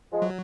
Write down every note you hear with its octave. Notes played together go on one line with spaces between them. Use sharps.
F3 G#3
F#3